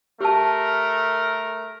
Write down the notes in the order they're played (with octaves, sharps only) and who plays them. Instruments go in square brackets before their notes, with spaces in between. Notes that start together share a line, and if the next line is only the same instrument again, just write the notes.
[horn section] A3 A#4 [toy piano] G4 A5